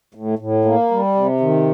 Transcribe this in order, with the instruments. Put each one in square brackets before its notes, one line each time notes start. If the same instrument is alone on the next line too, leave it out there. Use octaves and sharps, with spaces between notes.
[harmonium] A2
A2
A#3
G3
C3
D#3